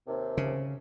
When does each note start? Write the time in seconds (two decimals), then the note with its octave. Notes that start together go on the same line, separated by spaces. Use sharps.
0.07 D#2 C3
0.37 C#3